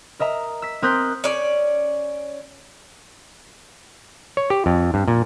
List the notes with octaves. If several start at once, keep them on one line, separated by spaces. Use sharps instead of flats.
A#4 D#5 E5 A#5
E6 B6
C4 A#4 D#6 F#6 G6 B6
C#4 D5
C#5
G4
F2
G2
A#2